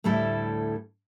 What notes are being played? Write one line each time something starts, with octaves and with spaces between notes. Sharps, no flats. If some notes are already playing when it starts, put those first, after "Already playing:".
D2 A2 G3 E4 A4 E5